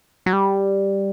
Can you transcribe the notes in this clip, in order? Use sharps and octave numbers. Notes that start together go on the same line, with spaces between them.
F#3
G3